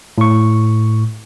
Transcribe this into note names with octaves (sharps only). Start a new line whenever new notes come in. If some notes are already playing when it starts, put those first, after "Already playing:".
A2 C#6